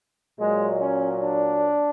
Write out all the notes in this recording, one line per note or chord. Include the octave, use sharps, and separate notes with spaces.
A#2 F#3 G#3
C#4
D4